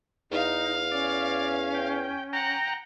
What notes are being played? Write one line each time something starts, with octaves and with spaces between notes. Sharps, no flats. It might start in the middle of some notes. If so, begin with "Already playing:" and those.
E2 D#4 F5
C#4 D5
G5
F#5 G5 A#5